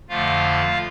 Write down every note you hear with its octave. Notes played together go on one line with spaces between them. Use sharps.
F2 D3 F3 A3 F4 F5